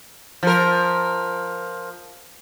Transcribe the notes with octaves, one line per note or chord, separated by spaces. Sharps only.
F3 A#4